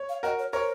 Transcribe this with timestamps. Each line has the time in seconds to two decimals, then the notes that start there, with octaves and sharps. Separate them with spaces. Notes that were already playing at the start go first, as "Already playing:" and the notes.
Already playing: C#5
0.09 F5
0.23 F#4 A#4 D#5
0.39 C#5
0.53 A#4 C5 C#5